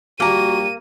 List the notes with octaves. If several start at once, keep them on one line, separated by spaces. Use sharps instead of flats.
A#1 G3 A#3 F#4 A#5 D#7